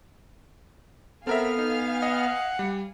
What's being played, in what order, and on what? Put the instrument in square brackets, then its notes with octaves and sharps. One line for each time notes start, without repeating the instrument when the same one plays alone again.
[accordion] B3 F6 [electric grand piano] C4 A#4 E5 [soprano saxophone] A4 [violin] F5 G#5
[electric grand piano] D#4
[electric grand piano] D#5 [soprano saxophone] F#5
[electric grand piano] G3